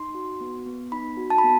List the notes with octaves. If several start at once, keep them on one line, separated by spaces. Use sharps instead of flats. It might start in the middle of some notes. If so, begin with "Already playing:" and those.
Already playing: D#4 C6
F#4
B3
B3
D#4 B5
F#4
A5
B5
B3